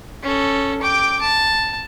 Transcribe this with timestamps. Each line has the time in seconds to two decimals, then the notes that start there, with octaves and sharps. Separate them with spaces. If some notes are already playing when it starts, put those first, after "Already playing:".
0.22 C#4 A4
0.82 G5 D6
1.22 A5